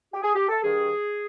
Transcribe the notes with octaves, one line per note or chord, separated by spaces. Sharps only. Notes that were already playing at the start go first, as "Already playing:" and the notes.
G4
G#4
G4
A4
G2 D#3 G#4